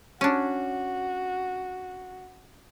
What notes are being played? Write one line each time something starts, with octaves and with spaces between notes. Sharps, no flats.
C#4 D4 F#4